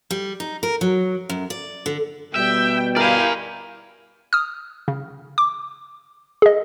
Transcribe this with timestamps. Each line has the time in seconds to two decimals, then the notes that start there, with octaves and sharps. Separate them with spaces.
0.11 G3
0.40 D#4
0.63 A#4
0.81 F#3
1.29 F#2
1.50 D5
1.86 D3
2.36 B2 G3 E5 G5
2.96 E4 G4 A#4 D5 F5 G#5
4.33 D#6 F6
4.88 C#3
5.38 D6
6.42 G#4 D#5